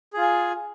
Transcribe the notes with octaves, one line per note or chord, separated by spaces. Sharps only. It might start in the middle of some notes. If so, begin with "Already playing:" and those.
F4 G#4 G#5